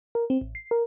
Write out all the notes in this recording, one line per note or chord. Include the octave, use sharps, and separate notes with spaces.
A#4
C4
A1
C7
A#4